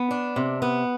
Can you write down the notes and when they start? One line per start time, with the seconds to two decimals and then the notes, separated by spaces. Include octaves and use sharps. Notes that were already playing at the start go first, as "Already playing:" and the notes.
Already playing: B3
0.11 D4
0.36 C3
0.62 B3